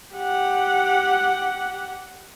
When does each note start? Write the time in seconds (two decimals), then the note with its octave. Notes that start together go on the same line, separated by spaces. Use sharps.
0.16 G4 F#5